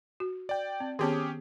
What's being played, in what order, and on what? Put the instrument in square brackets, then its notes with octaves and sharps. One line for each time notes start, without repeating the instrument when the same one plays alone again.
[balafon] F#4
[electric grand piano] D5 G5
[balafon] C4
[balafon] D#3 B3 A5 [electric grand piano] C#4 G4 G#4